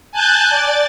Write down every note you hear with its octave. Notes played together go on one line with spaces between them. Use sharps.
G#5 A5 F#6 G6 A6
D5 A6